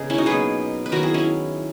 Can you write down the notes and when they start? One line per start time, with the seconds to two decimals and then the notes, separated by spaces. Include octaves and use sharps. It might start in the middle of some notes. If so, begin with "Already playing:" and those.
Already playing: C#3 G#3 B3 G#4 A#4
0.10 C#4 E4
0.18 D#4 F#4
0.26 B2 F#3 A#3 G#4 B4
0.86 B4
0.92 D#3 F#3 B3 F#4 A#4
1.03 E4 G#4
1.14 C#4 E4